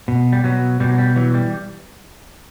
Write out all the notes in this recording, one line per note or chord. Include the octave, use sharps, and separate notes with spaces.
B2
G3
B2 F#3
B2 G3
F#3
G3
E3 F#3
G3